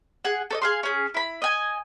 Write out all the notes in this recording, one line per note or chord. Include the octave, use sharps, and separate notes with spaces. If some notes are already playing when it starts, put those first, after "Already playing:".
G#4 F#5
A4 C#5 D#5
G#4 F5 C6
C#4 G#4
E4 B5
D#5 G#5